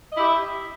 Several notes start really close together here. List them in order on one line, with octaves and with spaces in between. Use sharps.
D#5 E4 G4 E5